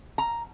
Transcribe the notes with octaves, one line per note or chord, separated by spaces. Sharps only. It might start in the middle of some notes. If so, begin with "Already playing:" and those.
A#5